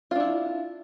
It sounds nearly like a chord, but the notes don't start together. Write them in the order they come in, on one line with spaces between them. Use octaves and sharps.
F4 D4 E4